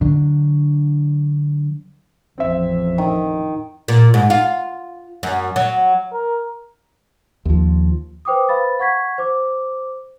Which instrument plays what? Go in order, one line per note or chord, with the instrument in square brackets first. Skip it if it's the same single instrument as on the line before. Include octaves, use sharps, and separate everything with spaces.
[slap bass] D3 F#3 D4
[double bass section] A1 F2 [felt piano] C4 E5
[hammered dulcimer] D#3
[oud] A#2
G#2
F4
F#2
F#3
[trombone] A#4
[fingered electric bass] D#2 F3
[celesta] B4 C5 G5 D6 D#6
B4 C5 F5 B5 A6
F#5 C#6 G#6 B6
C5 D6